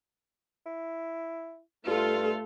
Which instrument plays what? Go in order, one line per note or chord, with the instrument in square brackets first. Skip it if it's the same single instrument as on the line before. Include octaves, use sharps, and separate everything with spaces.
[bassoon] E4
[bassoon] G2 [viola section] A3 F4 [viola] A4